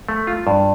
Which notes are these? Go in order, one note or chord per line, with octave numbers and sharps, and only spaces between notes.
A3
F4
G2